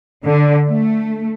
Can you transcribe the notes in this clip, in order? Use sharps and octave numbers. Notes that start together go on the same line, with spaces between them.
D3
A3